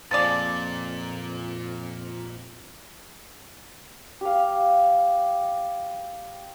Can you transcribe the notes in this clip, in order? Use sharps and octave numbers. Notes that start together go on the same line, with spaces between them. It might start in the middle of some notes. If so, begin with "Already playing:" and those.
F2 A#2 F3 G#4 D5 A6
G4 F5